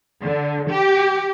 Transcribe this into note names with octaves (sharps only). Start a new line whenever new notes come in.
D3
G4